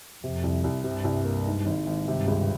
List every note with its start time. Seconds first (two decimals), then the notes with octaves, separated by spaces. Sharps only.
0.24 F2 C3
0.43 C2
0.64 C2
0.84 G2 C3
1.04 C2
1.25 A#3
1.46 G#2
1.66 G#1
1.87 G#1
2.08 G2 C3
2.28 C#2